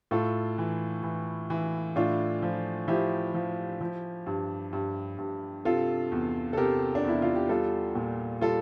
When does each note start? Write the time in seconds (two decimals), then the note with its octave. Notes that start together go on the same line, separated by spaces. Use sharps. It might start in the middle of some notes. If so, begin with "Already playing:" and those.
0.11 A2 F4 A4
0.58 E3
1.03 E3
1.50 E3
1.96 A2 D4 F4
2.42 F3
2.88 F3 E4 G4
3.34 F3
3.81 F3
4.27 G2
4.73 G2
5.18 G2
5.65 C3 F4 A4
6.12 E2
6.53 A4
6.57 C3 G4 A#4
6.95 D4
7.04 E2 E4
7.22 F4
7.35 G4
7.49 G3 F4 A4
7.95 A#2
8.41 G3 F4 A4